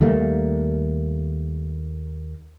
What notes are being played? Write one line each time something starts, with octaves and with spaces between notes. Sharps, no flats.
D#2 G3 A3 A#3